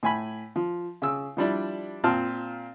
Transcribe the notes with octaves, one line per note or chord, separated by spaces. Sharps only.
A2 G#5 B5
F3
C#3 E6
F3 G3 D4 E4
A#2 C4 A5 F6